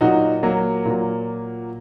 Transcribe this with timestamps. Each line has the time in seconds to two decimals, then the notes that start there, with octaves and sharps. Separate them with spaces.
0.01 A#2 F#3 D#4 F#4
0.43 F#3 A#3
0.86 A#2 F#3